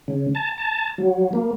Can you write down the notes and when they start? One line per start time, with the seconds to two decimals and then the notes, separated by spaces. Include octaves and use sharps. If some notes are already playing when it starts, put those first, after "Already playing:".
0.08 C#3
0.35 A5
0.58 A5
0.98 F#3
1.33 A#3